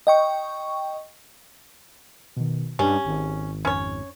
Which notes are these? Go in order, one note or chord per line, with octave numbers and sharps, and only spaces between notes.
D#5 G5 C#6
B2 D#3
G2 C#4 G4
G#1
F2 C#4 C#5